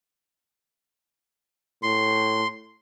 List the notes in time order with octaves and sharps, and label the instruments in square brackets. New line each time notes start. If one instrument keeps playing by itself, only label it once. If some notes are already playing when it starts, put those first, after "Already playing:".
[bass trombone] A2 [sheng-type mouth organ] C6